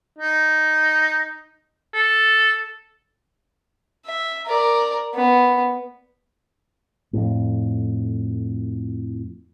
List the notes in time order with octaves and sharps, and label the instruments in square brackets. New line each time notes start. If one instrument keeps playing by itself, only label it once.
[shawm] D#4
A4
[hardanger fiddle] E5
A#4 D5
B3
[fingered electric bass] F2 A2